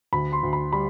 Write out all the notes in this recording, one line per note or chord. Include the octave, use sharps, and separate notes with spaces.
D2 B5
C6
D2
B5
G3 B5